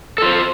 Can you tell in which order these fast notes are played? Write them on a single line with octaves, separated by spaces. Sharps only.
A4 F4 C5